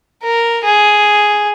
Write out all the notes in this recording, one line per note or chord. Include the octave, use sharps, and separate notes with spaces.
A#4
G#4